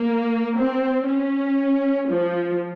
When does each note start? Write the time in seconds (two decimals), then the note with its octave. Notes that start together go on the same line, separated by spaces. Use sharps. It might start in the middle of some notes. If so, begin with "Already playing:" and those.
Already playing: A#3
0.58 C4
1.08 C#4
2.10 F3